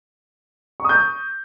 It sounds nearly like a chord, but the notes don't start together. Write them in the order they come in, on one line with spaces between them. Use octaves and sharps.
C#6 D#6 G6